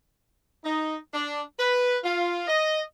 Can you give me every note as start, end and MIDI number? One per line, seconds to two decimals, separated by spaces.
0.64 0.96 63
1.12 1.41 62
1.59 1.96 71
2.04 2.43 65
2.47 2.81 75